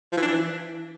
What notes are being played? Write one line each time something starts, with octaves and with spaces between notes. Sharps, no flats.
F3
E3
D4
E3